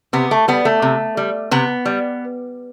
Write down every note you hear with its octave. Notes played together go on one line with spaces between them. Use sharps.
C3 B3
A3
G3 B3
A3
C3
G3
C3 B3
G3